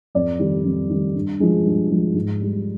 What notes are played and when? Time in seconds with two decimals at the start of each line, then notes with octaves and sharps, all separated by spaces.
0.15 F2 D5
0.39 D#3 G3
0.65 F2
0.89 D#3 G3
1.14 G2
1.40 F3 G#3
1.65 G2
1.91 F3 G#3
2.15 G#2
2.41 G3